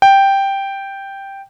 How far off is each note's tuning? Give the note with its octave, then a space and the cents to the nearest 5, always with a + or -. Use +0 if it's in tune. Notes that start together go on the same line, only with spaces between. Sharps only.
G5 +0